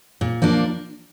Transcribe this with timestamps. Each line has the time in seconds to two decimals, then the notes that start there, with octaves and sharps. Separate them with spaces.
0.21 A#2
0.42 F3 A#3 D4